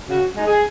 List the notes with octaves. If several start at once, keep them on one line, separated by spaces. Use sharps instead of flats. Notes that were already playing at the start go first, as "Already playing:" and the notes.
C#3 F#4
G#3 D#4
G#4